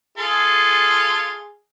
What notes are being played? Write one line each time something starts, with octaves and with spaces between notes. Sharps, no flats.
F4 G#4 A4